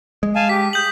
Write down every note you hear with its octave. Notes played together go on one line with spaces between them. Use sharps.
G#3
F5 G#5 A5
G4 B6
G#4 G6 F#7